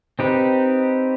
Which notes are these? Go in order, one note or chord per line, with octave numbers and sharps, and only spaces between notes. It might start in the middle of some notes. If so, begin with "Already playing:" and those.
C4 D#4 G4 B4